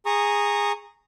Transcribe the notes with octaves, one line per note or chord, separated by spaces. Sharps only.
G#4 A#5 C#6 D#6